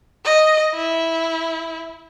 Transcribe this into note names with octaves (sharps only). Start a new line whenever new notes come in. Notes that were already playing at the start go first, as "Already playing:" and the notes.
D#5
E4